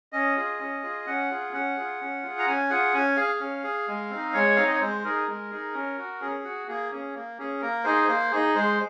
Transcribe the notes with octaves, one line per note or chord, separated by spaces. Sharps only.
C#4 D#5
F4 G#4
C#4
F4 G#4
C#4 F#5
F4 G#4
C#4 F#5
F4 G#4
C#4
F4 G#4
A#5
C#4 G#5
F4 G#4 F#5
C#4 G#5
G#4 F5
C#4
G#4
G#3
C4 D#4
G#3 C#5
C4 D#4 F5
D#5
C#5
G#3 C5
D#4 G#4 A#4
G#3
D#4 G#4
C#4
F#4
C#4 G#4
F#4
A#3 G#4
C#4 G#4
A#3
C#4 G#4
A#3 A#4
D#4 G#4 C5
A#3 C5
D#4 G#4
G#3 C5